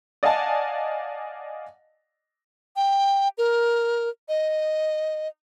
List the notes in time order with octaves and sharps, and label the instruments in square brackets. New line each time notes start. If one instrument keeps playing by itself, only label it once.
[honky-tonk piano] D5 D#5 F5 F#5 G#5 A5
[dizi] G5
A#4
D#5